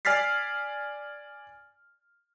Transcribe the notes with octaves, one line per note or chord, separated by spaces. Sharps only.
D5 G#5 F6 A6 B6 C7